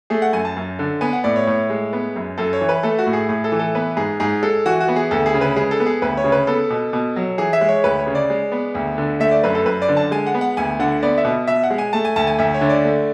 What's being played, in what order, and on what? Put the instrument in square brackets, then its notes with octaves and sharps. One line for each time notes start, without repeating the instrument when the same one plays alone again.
[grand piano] A3 G#4
F#5
F#2 G#5
A5
F#2
D3
B3 G#5
F#5
A2 D5
C#5
A2
G#3
B3
F#2
F#2 A4
C#5
E3
B4
A3 A4
F#4
A2
G#4
A2 G#4
A4
E3
A4
B3 B4
G#2 G#4
G#2 G#4
G#3 A4
E3 F#4
F#4
B3
G#4
D2 A4
G#4
C#3
B4
G#3 G#4
A4
B3
G#4
D2 B4
C#5
C#3
B4
B3 A4
B2
B2
F#3
E3 G#4
E5
G#3
C#5
D2 B4
C#5
C#3
D5
G#3
B3
D2
D3
A3 E5
D5
F#2 B4
A4
F#2 B4
D5
D3
A5
G#3 G#5
F#5
B3
F#5
D2 G#5
D3 F#5
B3 D5
E5
B2
B2 E5
F#5
G#3
G#5
A3 A5
G#5
D2 A5
G#5
D2 E5
C#5
D3
D5
A3